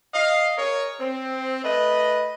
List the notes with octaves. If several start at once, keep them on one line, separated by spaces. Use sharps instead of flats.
D#5 F5
G#4 A#4 C#5
C4
A3 B4 D#5